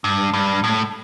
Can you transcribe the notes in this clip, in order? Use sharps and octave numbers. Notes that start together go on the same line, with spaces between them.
G2
G2
A2